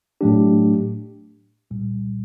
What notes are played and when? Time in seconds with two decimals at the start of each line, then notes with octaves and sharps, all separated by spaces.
0.21 A2 F#3 A3 D4 G4
1.71 C2 A#2 G3